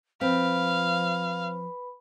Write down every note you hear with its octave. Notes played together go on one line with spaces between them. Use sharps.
F3 C4 B4 F5 B5